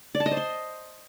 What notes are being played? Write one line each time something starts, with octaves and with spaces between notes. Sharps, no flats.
D5
A5
D#5
C5
C6